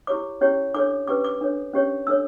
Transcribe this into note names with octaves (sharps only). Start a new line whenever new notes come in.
E4 G4 C#5 D6
C#4 E4 G4 C#5
D4 A4 C#5 D6
C#4 G4 B4 D6
D6
D4 A4 C#5
C#4 G4 C#5
D4 A4 C#5 E6